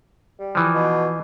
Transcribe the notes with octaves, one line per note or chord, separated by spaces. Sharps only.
G3
E3 F3
B2